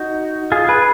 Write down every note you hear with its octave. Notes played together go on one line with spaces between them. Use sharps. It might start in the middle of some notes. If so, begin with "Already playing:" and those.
Already playing: D#4 F#4
F4 G#4
G#4 B4